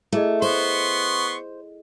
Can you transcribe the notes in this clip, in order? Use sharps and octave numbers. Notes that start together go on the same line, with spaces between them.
A3 E4 G#4 D#5
B3 C5 C6 C#6